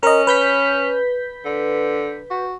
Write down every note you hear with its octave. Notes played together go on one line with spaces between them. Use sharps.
C#4 A#4 D#5
B4 G6 B6
D3
F#4